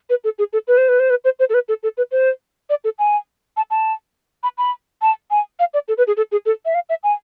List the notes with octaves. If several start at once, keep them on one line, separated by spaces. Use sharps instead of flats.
B4
A4
G#4
A4
B4
C5
B4
C5
B4
C5
C5
A4
B4
A4
A4
B4
C5
D5
A4
G#5
A5
A5
B5
B5
A5
G#5
F5
D5
A4
B4
G#4
A4
G#4
A4
E5
F5
E5
G#5